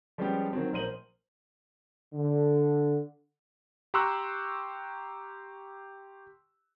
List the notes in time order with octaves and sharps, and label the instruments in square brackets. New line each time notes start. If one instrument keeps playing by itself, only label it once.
[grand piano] F3 G3 G#3 B3 C#4 G4
D#3 F#3 C4
A#1 A#4 C5 D#7 F#7
[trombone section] D3
[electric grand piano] G4 A#5 C6 C#6 E6 F#6